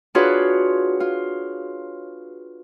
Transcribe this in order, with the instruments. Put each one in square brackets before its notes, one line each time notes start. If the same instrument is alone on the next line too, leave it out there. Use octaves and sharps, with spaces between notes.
[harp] D4 F4 F#4 G#4 B4 C#5
F4